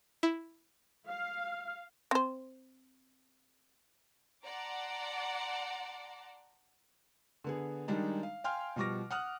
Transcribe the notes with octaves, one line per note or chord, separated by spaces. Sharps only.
E4
F5
C4 C5
D5 F#5 A5 A#5 C6 D6
D3 B3 G#4
D#3 G3 G#3 D4 D#4
F5
F5 G5 G#5 C6 F6
B2 F3 G3 C#6 D6 A#6
F#5 D#6 F6 F#6